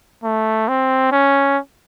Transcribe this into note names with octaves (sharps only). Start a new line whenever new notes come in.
A3
C4
C#4